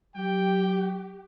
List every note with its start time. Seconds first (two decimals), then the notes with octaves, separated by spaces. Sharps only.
0.15 F#3 G4 G5